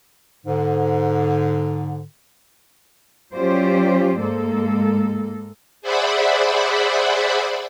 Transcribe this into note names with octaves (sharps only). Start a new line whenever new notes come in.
G#2 D3
F#3 C#4 F4 G4 C5 D5
G#2 G#3 A#3 A4
G#4 C5 D5 E5 F#5 B5